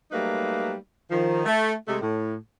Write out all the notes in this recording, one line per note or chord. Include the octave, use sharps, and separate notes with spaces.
F#3 G3 A3 A#3 D#4 B4
D#3 F3
A3
C3 G#3 A3
A2